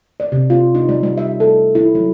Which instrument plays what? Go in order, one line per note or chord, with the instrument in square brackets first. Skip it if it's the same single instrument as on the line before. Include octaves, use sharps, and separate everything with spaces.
[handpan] D5
C3
F4
D#4
G3
G3
E5
A4
E4
F#3